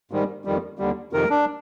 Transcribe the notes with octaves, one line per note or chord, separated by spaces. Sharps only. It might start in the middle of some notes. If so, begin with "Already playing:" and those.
G#2 D#3 G3
F2 D#3 G3
D#2 D3 G3
F2 C3 D#3 A#4
D4